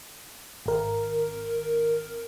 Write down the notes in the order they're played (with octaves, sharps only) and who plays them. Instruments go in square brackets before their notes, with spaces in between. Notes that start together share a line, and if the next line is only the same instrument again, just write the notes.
[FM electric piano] G#1 A#4